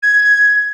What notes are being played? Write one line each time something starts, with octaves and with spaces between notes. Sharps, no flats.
G#6